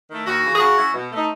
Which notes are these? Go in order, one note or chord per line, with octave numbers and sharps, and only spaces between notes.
D#3 A3 E4
D#2 F#4
C#3 E3
G#4
C#3 F#4
F#3 C#4 E4
B2
A3 D#4